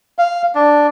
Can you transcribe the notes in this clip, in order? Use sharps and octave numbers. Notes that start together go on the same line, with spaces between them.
F5
D4